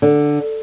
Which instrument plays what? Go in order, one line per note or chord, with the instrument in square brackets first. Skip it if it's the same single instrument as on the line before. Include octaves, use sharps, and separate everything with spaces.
[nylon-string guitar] D3